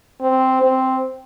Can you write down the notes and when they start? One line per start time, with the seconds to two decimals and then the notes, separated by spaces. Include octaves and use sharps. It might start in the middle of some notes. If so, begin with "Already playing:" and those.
0.21 C4
0.62 C4